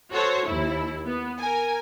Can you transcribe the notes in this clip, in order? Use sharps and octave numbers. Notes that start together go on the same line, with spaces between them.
F#4 A4 C5 C#5
D#2 E4
B3
A#4 G#5